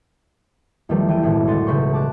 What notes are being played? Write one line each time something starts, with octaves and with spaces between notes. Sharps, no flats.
E2 D#3 F3 G3 A3
E3 G5 D#7
B1 F#2 A2 D#3 G#3 A3
D2 F#5 C6 A6 D#7
E1 C#2 C#3 B4 C5 C#6
A5 D6 F#6